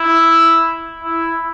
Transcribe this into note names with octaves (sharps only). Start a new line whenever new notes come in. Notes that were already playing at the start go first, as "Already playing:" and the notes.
Already playing: E4
E4